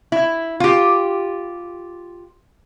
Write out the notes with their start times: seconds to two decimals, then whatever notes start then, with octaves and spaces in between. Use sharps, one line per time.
0.12 E4
0.60 F4 G4